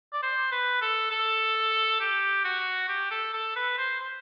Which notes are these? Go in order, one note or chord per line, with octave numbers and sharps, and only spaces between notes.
D5
C5
B4
A4
A4
G4
F#4
G4
A4
A4
B4
C5
C5